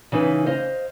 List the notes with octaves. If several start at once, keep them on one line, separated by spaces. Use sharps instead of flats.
C#3 E3 D#4 B4
C5 D#5 F5